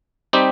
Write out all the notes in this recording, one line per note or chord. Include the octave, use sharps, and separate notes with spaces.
G3 C4 D#4 G4